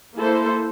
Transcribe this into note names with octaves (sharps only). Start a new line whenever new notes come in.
A#3 E4 A4 C5